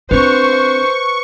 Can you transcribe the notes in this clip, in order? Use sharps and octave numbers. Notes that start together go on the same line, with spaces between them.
C4 D4 B4 C5 C#6